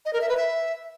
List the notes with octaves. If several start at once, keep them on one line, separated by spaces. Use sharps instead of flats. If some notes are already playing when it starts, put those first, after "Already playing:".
D#5
A#4
E5
B4
E5